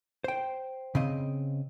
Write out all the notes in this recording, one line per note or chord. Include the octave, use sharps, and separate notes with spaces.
C5 G5
C#3 C4 D#5